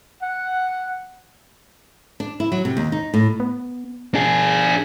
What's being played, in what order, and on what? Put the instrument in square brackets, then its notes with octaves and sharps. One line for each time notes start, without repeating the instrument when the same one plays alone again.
[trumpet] F#5
[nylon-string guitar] D4
E4
F#3
C3
D#2
D#4
A2
[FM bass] B3
[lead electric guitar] D4 G#4